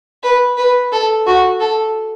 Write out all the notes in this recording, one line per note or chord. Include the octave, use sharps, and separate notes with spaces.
B4
B4
A4
F#4
A4